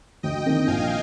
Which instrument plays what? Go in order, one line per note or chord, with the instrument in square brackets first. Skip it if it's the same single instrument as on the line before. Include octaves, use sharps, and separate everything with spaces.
[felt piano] D2 [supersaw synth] D#5 G5
[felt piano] C3 D#3 A#3 D4
[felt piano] A#1 [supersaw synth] F5 G#5